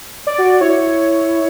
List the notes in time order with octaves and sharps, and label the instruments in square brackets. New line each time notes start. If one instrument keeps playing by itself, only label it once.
[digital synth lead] D5
[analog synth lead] F#4
[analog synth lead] E4 [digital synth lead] C#5